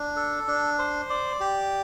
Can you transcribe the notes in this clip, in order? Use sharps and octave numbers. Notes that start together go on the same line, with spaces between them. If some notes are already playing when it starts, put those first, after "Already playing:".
Already playing: D4
A4
D4
C5
D5
G4